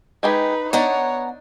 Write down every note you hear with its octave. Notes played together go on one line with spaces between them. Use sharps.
G#3 D#4 G4 G#4 B4
B3 D4 D#4 C#5 F#5 A#5